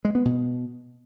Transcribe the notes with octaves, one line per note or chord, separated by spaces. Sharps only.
G#3
B3
B2